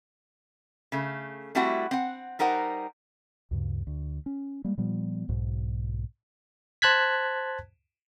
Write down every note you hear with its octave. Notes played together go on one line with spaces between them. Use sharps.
C#3 A3
G3 A3 C4 E4 F#4 F#5
C4 F#5
G3 D#4 A#4 C5 F#5
D2 G2 C#3
D2
C#4
G3 G#3 A#3
A#2 F3 G3 B3
B1 G#2 B2
C5 A5 F#6 G#6 B6